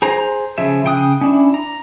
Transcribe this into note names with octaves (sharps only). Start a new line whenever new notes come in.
G#4 C5 A#5
C#3 F3 G#4 E5
C#3 G5 D#6 F#6
C#4 D4 E4
A#5